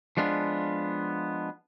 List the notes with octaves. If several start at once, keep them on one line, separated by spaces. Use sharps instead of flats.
F3 G#3 B3 D4 F4